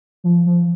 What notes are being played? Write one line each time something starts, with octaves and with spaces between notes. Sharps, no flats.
F3
F3